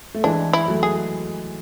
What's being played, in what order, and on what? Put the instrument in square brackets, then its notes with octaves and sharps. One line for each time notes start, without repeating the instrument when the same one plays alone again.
[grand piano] A3
[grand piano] E3 G#3 [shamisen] D4
[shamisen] E4
[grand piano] F#3 A3
[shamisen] G#4